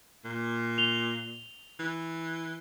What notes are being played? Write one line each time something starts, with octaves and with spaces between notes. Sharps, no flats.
A#2
F7 G7
E3